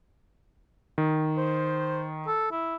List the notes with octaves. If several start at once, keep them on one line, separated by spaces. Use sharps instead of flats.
D#3
C5
A4
E4